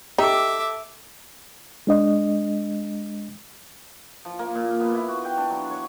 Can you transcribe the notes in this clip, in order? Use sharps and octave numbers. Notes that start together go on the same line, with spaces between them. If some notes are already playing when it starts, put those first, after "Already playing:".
D#4 G4 A4 E5 D6
G#3 D4 D#5
F3
A#3
A#2
B3
E4
F#4
G5
D4
F#3
C#5